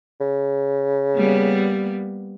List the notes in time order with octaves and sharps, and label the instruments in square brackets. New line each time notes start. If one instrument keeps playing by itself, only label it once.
[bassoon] C#3
[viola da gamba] G3 A#3 B3